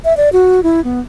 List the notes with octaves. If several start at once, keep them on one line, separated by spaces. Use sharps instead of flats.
E5
D5
F#4
E4
B3